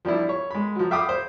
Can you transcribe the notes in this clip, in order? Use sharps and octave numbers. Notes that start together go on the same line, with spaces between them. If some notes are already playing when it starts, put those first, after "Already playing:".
F3 G3 D4 E4
C#5
G#3 B5
F3 F#3
E5 F5 G5 B5 D6 D#6
C5